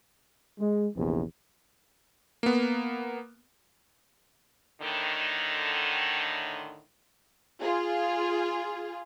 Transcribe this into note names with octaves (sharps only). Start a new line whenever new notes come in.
G#3
A#1 E2 C3 E3
A#3 B3
A2 D3 D#3
F4 G#4